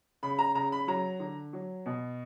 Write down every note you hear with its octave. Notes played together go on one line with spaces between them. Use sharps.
C#3 B5
A#5
C#3 A#5
B5
F#3 A#5
D3
F#3
B2